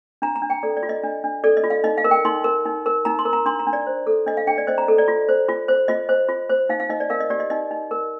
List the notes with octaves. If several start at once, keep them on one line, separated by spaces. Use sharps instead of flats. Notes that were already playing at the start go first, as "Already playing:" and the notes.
D4 A#5
A#5
D4
G5
A4 D5
D5
F4
D#5
D4
D4
A4 D5
D#5
F4
F5
D#4 D#5
F5
A#4
G5
D#4 C6
A#4
D#4
A#4
D#4 A#5
C6
A#4
A#5
D4 C6
A#5
D4
D5
C5
A4
D4 D#5
F5
D4 G5
D5
C5 D#5
A#5
A4
D5
F4
C5
F4
C5
F4 D#5
C5
F4
C5
D#4 F5
F5
D#4 D#5
D5
A#4 F5
D#5
G4 D5
D#5
D#4 D#5
D#4
A#4